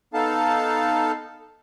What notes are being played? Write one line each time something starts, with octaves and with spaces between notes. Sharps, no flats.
B3 D#4 A4 F5 A5